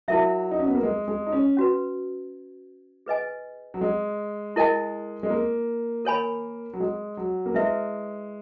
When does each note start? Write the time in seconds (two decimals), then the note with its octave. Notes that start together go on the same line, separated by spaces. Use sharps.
0.08 F#3 E4 A#4 E5
0.51 D#4
0.59 C#4
0.67 B3
0.75 A#3
0.83 G#3
1.08 G#3
1.27 D#4
1.32 C#4
1.57 C#4 F#4 B4
3.06 G#4 B4 D#5 G#5
3.74 F#3
3.81 G#3
4.56 E4 A#4 D#5 G#5
5.23 G#3
5.30 A#3
6.05 A#4 C#5 G#5 B5
6.73 F#3
6.80 G#3
7.17 F#3
7.46 A#3
7.54 G#3 E4 B4 E5